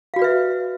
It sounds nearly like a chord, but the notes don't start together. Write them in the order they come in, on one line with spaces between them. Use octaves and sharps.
F5 F#4 D5 B4 E5